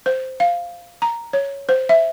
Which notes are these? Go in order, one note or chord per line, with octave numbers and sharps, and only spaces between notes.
C5
F5
A#5
C#5
C5
E5